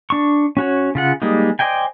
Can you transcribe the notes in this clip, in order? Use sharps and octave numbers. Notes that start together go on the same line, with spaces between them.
D4 C#6
C#4 F#4 C#5
C#3 F4 F#5
G3 G#3 A#3 D#4
C5 D5 D#5 G5 G#5